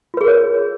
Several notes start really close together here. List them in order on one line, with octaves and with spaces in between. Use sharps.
F4 B4 G#4 A#4 C#5